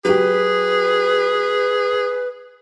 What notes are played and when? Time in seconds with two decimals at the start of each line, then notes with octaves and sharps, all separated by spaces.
0.05 F#3 G4 G#4 B4